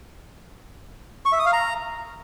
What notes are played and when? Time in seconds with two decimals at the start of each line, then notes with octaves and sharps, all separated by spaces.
1.25 C#6
1.32 E5
1.39 D#6
1.46 F5
1.53 A#5